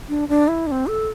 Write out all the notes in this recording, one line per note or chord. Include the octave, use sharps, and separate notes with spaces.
D4
D4
E4
D4
C4
A4